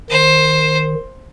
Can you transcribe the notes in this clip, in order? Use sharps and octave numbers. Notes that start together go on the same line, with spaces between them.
D#3 C5